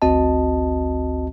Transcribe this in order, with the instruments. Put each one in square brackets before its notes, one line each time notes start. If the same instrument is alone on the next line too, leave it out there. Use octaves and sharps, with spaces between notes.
[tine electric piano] G#1 D2 C4 F#4 D#5 A5